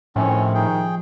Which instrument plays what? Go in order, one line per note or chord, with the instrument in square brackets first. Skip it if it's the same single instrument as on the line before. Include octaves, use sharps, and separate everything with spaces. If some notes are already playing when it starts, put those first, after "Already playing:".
[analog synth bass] A2 [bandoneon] D#3 C4 [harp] F3 G3 [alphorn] C#4
[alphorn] D#3 [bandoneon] G#4 G5